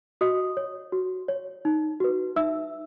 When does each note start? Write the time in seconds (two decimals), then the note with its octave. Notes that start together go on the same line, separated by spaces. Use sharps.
0.21 F#4 D#5 D#6
0.57 C#5
0.92 F#4
1.28 C#5
1.65 D#4
2.00 F#4 B4
2.36 D#4 E5 E6